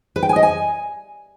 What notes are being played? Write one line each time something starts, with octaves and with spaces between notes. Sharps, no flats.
B4
G5
G#5
D#5
G#5